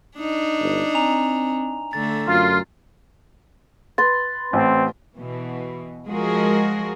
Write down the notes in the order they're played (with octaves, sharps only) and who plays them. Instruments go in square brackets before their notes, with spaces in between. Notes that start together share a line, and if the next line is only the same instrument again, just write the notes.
[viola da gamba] D4 D#4
[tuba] G1
[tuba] C4 [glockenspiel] G#5 A#5 F7
[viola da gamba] D3 A3 [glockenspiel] A6
[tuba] F#2 [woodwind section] F4
[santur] B4 C6 [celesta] A6
[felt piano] A1 [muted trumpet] C4
[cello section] B2 E3
F3 G#3 F#4 G#4 A#4